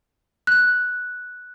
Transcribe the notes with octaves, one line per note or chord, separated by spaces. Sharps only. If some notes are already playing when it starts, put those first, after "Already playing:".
F#6